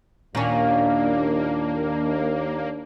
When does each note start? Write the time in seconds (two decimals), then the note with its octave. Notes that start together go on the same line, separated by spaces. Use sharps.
0.35 D#2 A#2 A#3 C#4 D4